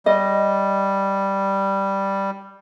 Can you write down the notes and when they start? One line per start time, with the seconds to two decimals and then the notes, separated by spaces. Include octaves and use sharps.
0.06 G3 D#5